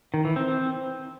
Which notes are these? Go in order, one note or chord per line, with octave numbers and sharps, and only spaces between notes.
D#3
E3
C4